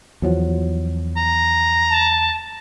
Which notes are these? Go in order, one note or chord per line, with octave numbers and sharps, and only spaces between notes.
E2 F3 F#3
A#5
A5